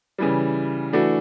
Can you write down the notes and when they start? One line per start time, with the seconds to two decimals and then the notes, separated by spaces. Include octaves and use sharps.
0.18 C#3 E3 G3
0.93 E3 A3 D4 F#4